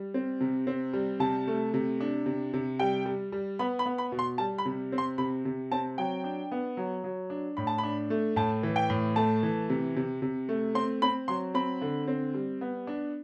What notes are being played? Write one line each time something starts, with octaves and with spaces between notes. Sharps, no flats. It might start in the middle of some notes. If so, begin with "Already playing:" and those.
Already playing: G3
C4
C3
C4
G3
C3 A5
A3
C3
D4
C3
C3
G3 G5
G3
G3
B3 B5
B5
B3
B5
B2
C6
G3 A5
B5
C3
C4
C6
C3 B5
C3
C4 A5
F#3 G5
D4
B3
F#3
F#3
D4
A2 B5
A5
B5
D4
A3
A2 A5
E3
G5
A2
A3 A5
E3
C3
C3
C3
A3
C4 C6
C4 B5
F#3 C6
C4 B5
D3
C4
G3
B3
D4